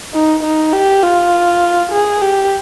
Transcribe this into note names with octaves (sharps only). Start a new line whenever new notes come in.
D#4
D#4
G4
F4
G#4
G4